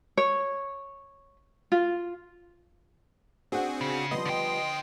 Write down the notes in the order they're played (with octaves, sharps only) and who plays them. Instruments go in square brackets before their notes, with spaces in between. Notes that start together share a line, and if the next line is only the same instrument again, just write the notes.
[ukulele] C#5
F4
[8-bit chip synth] C4 F#4 G#4 [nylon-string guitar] D4 F#5
[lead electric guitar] C#3
[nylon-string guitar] F3 G3 B3 [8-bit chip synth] D#5 C6
[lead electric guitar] D3 G5